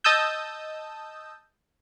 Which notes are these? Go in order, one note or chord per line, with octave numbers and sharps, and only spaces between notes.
D#5 A5 D#6 E6 G6